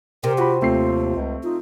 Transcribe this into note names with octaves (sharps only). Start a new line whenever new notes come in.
C3 G4 A#4
F4 F#4 B5
D#2 A3 C4 F4 C7
C#2
D#4 F4